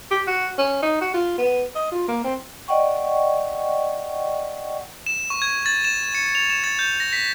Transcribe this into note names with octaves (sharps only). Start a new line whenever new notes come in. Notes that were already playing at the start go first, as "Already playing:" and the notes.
G4
F#4
C#4
D#4
F#4
F4
B3
D#5
F4
A#3
C4
D5 D#5 F#5 G5 C#6
E7
C#6
G#6
A6
E7
C#7
F7
E7
A6
G6
A#6
B6